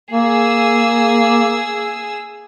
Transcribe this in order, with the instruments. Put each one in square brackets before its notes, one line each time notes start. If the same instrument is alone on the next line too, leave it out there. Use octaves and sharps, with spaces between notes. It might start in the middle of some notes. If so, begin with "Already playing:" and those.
[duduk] A#3 [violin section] G#4 E6